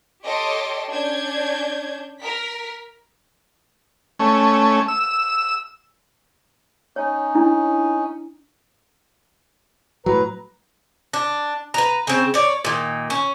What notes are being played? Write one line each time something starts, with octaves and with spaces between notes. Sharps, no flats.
G4 A4 C#5 D#5 C6 D6
C#4 D4 G6 G#6
A#4 B6
A3 C#4
E6
C#4 D#4 C#5
D4 E4
A2 F#3 B4 A#5
D4
B4 A#5
C#3 C4
C#5 D5
A#2 D#3
C#4